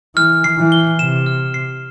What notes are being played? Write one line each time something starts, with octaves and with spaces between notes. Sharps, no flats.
E3 F6
C7
E3
G7
C3 E7
F6
C7